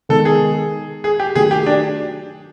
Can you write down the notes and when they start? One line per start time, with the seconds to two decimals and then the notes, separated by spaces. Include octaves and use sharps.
0.09 D#3 G#3 B3 A4
0.25 G#4
1.04 G#4
1.20 G4
1.35 D#3 F#3 A3 G#4
1.51 G4
1.66 D4